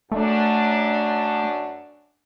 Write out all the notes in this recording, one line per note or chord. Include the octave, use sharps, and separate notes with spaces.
F#2 A3 D4